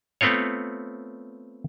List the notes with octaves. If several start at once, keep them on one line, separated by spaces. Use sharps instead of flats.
A3 B3 C4 F4 C#5